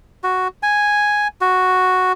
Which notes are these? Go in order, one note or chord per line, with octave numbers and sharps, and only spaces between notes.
F#4
G#5
F#4